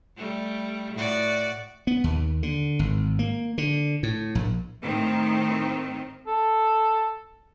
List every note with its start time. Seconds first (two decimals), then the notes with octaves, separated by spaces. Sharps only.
0.17 G3 A3
0.94 A2 F#4 D5
1.87 B3
2.04 D#2
2.43 D3
2.79 G#1
3.19 A#3
3.58 D3
4.03 A2
4.35 A#1
4.82 A2 D#3 C4
6.27 A4